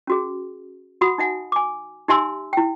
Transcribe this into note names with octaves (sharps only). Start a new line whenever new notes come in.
C#4 F#4 G#4
F#4 F#5 B5 D#6
D#4 E5 F#5 G#5
G#5 D6
D#4 G4 E5 G#5 C6 E6
E4 G5